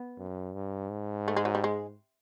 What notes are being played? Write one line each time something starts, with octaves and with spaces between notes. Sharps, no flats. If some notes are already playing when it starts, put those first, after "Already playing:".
Already playing: B3
F#2
G2
G#2
A3
G#3
F#3
G3
G#3